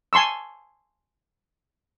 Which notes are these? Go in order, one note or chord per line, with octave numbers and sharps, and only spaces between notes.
G#5 A5 C6 C#6 E6